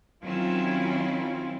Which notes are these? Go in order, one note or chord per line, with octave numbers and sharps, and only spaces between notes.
D#3 F#3 C4 C#4 E4 F4